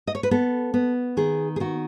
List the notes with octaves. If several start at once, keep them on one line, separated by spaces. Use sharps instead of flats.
D#5
C#5
B4
B3 A4
B3
D#3 G#4
G#4
D#3 F#4